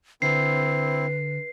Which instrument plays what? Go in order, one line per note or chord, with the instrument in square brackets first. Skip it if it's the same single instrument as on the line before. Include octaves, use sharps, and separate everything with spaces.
[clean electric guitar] D3 [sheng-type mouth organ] C4 E4 [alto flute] B4 [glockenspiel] C7